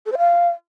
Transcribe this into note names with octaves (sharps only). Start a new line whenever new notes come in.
A4
C5
F5